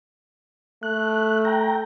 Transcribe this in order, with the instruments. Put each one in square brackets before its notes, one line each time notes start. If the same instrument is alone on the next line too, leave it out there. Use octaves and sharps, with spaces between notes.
[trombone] A3 [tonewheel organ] F#6
[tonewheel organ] G5 A#5